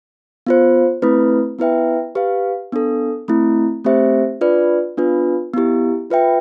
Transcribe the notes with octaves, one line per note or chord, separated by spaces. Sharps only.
B3 F4 C5
A3 C4 E4 B4
B3 E4 B4 E5 G5
G4 B4 F5
B3 D4 A4
A3 C4 E4
A3 C4 G4 C5 E5
D4 F4 B4 D5
B3 D4 F4 B4
B3 E4 G4
F4 B4 E5 G5